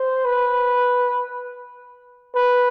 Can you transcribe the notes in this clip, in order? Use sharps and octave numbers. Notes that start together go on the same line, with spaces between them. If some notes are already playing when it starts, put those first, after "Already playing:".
Already playing: C5
B4
B4